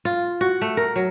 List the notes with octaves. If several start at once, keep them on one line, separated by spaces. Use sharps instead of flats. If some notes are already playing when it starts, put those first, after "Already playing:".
F4
F#4
A3
A#4
F#3